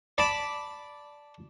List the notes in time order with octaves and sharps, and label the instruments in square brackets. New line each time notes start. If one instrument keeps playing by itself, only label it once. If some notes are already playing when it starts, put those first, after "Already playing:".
[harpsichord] D5 A5 B5